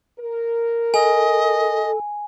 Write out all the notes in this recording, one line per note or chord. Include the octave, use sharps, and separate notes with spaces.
A#4
A4 D#5 G#5